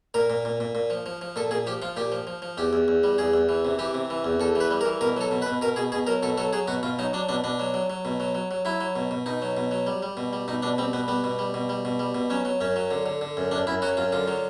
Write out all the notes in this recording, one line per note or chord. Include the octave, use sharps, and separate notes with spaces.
A#2 A#4
A#2
A#2
A#2
A#2
F3
F3
F3
A#2 A4
A#2 G#4
F3 G4
F3 F4
A#2 G4
F3
F3
F3
E2 G4
E2
E2
G3
E2 G#4
E2
E3
C3
E3 G4
C3
E3
E2
E2 A4
E3 B4
G3
A#4
E3
B2 A#4
F#3 A4
B2
B4
B2
B2 A#4
B2 G#4
B2 G#4
F#3 A#4
B2 A4
F#3 A4
F#3 G#4
B2 F#4
B2 F4
F#3 D#4
F#3 D4
B2 D4
B2 D4
F#3
F#3
F#3
B2
F#3
F#3
F#3
F#3 E4
F#3
B2
B2
B2 D#4
F#3
B2
F#3
G3
G3
B2
G3
B2 D#4
B2 D4
G3 C4
B2 B3
G3 B3
B2
G3
B2
G3
B2
G3
B2
F#3 C#4
F#3
F#2 C#4
F#3
D3
D3
D3
F#2
F#2 D4
F#2 E4
F#3 F#4
F#2 F4
D3 F4
F#3